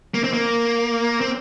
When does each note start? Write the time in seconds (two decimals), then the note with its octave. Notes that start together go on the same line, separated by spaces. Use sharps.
0.14 A#3
0.24 C4
0.33 A#3
1.21 C4